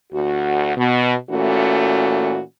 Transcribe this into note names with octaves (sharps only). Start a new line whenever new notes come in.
D2 F#4
B2
A#2 E3 A3 C#4 F#4